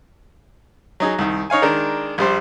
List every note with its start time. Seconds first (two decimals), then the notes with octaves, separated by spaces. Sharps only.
1.00 F#3 D#4 G#4
1.19 C2 D#3
1.50 D#4 C#5 F5 G#5
1.62 D#3 G#3 D4 A#4
2.18 A#1 G3 C5